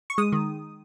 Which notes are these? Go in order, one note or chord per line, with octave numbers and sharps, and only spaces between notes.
C#6
G#3 D#6
D#3